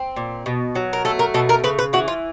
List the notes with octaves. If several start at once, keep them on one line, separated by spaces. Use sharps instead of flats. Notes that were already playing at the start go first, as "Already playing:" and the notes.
Already playing: C4
A#2
B2
F#3
A#4
A3 A4
A#4
B2 A4
A#4
C#3 B4
B4
E3 F#4
F4